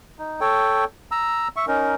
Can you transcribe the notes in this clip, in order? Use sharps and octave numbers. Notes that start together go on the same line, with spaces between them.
D#4
A4 C#5 G5
A#5 E6
E5 C#6
C#4 D#4 A#4